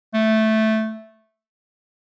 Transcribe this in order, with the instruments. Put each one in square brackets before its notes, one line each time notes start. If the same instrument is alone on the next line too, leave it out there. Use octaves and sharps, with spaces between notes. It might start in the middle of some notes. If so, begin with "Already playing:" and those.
[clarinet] A3